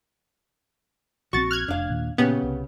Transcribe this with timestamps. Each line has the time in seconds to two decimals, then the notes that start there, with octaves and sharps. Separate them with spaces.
1.33 A#1 E3 C4 F#4 C#6 A6
1.51 F6 F#6 G#6
1.68 F1 D4 F5
1.90 D#2 A#2
2.18 A#2 C#3 B3 C#4 G4
2.43 C2